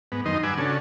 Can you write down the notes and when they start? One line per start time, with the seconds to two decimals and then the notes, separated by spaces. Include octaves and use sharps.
0.12 G#2 B3
0.26 F#2 D#3 D#4 D#5 C6
0.43 G2 B4 F#5 G#5 D6 E6
0.58 C#3 C#4 D4 F#4 A4